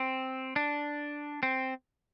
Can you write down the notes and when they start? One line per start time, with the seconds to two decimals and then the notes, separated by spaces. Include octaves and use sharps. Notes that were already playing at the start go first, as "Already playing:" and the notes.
Already playing: C4
0.56 D4
1.43 C4